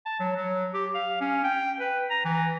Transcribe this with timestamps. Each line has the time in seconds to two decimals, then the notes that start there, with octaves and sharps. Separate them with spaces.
0.06 A5
0.20 F#3
0.37 F#3
0.74 G4
0.95 F5
1.21 C#4
1.44 G5
1.80 B4
2.10 A#5
2.25 E3